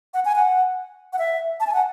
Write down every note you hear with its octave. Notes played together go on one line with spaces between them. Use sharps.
F#5
G#5
F#5
F#5
E5
A5
G#5
F#5